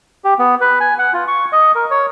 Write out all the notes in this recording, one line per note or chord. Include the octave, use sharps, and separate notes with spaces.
G4
B3
B4
G#5
F#5
F4
C#6
D#5
A#4
C#5